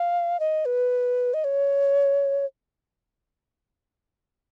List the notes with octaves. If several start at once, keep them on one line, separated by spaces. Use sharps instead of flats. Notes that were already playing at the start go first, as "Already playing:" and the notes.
Already playing: F5
D#5
B4
D#5
C#5